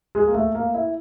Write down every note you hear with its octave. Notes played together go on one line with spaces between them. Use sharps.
G#3
A#3
A3
A#3
E4